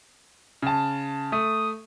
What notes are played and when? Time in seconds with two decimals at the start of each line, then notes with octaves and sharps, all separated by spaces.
0.62 C#3 A5
1.32 A3 D#6